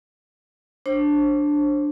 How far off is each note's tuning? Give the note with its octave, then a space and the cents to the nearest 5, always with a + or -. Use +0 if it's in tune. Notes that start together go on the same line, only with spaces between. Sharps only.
D4 +0 C5 +35